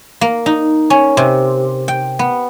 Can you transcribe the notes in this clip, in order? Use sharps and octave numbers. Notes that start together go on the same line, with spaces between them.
A#3
D#4
C#4
C3
G5
B3